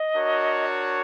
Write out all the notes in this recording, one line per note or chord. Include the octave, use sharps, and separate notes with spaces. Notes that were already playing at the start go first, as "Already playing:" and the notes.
Already playing: D#5
D4 F#4 A#4 C#5